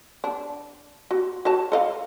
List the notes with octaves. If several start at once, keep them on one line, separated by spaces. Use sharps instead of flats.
D4
F#4
F#4 C#5 A5
A4 D#5 F5